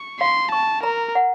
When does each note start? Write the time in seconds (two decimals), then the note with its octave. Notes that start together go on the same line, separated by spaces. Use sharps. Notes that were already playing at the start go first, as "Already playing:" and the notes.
Already playing: C#6
0.20 F5 C6
0.52 A5 C#6
0.83 A#4 A#5
1.15 F#5